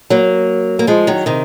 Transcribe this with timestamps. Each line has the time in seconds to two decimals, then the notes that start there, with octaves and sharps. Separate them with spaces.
0.10 F#3 A#3
0.79 A#3
0.87 F3 G#3
1.07 D#3 F#3
1.26 C3 D#3